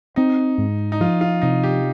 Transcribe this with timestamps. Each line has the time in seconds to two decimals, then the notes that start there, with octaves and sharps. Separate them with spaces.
0.16 C4 D#4
0.58 G#2
0.92 D#4
1.01 F3 F4
1.21 F4
1.42 C3 D#4
1.63 G4